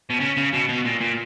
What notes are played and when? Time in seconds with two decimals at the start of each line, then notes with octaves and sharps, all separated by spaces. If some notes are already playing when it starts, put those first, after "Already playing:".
0.10 B2
0.20 C#3
0.37 C#3
0.53 B2
0.69 B2
0.85 A#2
1.01 A#2